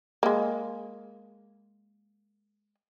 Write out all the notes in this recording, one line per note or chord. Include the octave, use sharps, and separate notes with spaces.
G#3 A#3